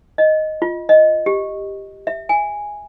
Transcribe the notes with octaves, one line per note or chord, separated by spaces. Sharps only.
D#5
F4
D#5
G4
E5
G#5